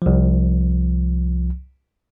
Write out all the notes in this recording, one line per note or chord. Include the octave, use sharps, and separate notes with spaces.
C2 F3